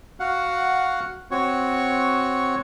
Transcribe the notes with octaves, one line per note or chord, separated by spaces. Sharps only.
F#4 F5 F#5
C4 F#4 C#5 C#6